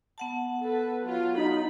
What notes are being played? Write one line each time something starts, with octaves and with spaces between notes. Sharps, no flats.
B3 F#5 A5
A4 B4
F#3 F4
D#4 B5